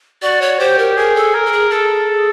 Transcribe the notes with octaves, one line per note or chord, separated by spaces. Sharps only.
F#4 D5
C#5
G4 C5
A#4
G#4 A#4
A4
A#4
A4
G#4
G#4 A4